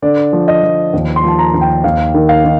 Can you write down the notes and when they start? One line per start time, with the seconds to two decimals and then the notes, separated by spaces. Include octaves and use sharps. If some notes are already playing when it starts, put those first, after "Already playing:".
0.02 D3 D5
0.33 F3
0.48 D#5
0.63 F3
0.93 D#2
1.16 C6
1.23 F3 A5
1.39 A#5
1.54 D#2
1.61 G5
1.84 D#2 F5
2.14 D#3
2.29 F5
2.45 D#3